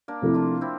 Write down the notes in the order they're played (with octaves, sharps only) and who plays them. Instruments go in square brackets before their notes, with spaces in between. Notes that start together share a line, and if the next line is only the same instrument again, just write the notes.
[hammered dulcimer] A#3 D4
[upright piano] C3 F3 A3 E4
[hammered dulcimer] D4 F4
C4 E4